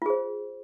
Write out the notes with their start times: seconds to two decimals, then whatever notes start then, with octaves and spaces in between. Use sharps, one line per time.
0.02 F4
0.06 G#4
0.10 C5